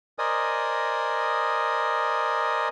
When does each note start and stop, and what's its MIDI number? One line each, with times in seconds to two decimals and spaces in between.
0.19 2.69 70
0.19 2.69 72
0.19 2.69 74
0.19 2.69 75
0.19 2.69 80
0.19 2.69 87